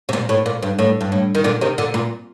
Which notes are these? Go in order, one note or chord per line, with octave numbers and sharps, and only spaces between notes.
C3
A#2
A2
A#2
G2
A2
G2
A2
D#3
A#2 D3
C3 D#3
A#2 D3
A#2